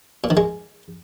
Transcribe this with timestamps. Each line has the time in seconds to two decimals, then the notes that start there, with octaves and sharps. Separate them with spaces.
0.24 A#2
0.30 D#3
0.37 G#3